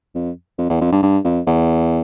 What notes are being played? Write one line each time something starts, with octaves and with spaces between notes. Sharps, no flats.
F2
F2
E2
F2
G2
G2
F2
E2